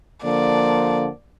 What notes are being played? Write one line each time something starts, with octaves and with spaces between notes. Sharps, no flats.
D3 F3 A#3 D5